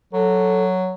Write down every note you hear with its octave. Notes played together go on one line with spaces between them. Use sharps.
F#3 A4